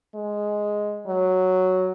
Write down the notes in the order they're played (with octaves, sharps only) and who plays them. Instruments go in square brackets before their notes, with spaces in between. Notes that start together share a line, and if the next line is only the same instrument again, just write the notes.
[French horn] G#3
F#3